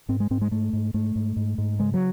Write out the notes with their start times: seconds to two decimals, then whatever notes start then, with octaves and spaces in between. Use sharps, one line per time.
0.09 G#2 C4
0.20 G#3
0.30 G#2 C4
0.41 G#3
0.51 G#2 A3
0.73 G#2
0.94 G#2 A3
1.16 G#2
1.36 G#2
1.58 G#2
1.79 C#3 G#3
1.94 F#3